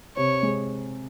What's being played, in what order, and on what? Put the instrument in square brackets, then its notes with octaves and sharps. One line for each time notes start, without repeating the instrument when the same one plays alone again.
[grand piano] C3 [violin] C#5
[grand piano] G#3